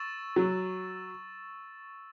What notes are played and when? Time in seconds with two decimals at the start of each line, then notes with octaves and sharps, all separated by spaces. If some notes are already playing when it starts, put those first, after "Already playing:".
Already playing: C#6 E6 A6 E7
0.36 F#3